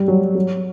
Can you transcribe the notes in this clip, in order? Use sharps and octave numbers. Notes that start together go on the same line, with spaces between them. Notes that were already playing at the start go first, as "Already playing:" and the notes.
Already playing: G3
F#3
F#3